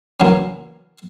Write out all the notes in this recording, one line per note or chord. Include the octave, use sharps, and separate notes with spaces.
E2 C#3 F#3 A#3 C#4